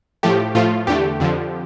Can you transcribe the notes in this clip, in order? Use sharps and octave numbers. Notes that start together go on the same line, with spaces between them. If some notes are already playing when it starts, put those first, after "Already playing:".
A2 F3 A3 G4
A2 F3 A3 F4
E2 D3 A3 G4
F2 D3 F3